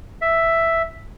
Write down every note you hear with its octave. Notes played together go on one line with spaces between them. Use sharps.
E5